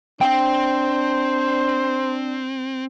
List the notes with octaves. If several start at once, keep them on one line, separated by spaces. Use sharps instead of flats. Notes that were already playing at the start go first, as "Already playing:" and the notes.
C4 D4 C5 G5